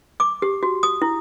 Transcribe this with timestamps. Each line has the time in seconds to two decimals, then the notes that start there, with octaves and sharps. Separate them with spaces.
0.20 D6
0.42 G4
0.63 F#4
0.83 D#6
1.02 E4